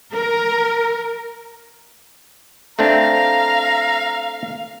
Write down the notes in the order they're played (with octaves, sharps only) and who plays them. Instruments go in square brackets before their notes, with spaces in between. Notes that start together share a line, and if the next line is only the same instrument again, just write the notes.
[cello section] A#4
[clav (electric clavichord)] A3 C4 D4 [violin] F5 [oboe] A#5